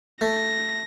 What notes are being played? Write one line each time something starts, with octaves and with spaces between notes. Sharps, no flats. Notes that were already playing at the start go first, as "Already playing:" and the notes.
A3 A#6